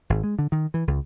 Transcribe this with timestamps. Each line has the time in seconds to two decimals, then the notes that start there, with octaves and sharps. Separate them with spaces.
0.10 G#1
0.24 G#3
0.39 D3
0.52 D#3
0.74 E3
0.87 C#2